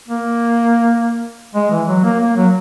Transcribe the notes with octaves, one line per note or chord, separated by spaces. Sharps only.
A#3
G#3
E3
F#3
A#3
A#3
F#3